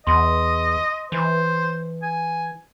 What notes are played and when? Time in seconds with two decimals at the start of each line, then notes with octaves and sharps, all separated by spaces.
0.07 E2 D#5 C6
1.12 E3 C5
2.02 G#5